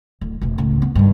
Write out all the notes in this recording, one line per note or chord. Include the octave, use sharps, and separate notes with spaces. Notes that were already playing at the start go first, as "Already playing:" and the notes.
D1
F1 B2
C#2 A2
B3
G2 D#3